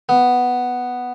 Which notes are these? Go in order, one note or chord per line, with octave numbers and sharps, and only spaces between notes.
B3